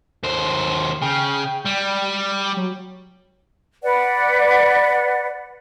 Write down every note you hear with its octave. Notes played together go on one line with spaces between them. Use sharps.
D#2 C5
C#3 G5
G3
F#3
B4 D5 F#5